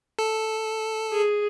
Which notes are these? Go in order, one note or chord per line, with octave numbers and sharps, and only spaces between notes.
A4
G#4